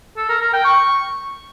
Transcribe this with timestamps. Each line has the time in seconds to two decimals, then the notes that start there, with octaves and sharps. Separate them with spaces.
0.17 A4
0.29 A#4
0.41 A#4
0.53 G5
0.65 C#6